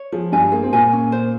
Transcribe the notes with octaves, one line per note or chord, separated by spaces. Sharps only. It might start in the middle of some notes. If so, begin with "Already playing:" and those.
Already playing: C#5
F3 G#4
G2 G3 G#5
A#3 G#4
C4
A#2 A#3 G#5
C#4
C5